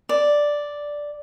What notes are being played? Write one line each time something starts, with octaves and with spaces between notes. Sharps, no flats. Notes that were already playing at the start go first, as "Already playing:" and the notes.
D5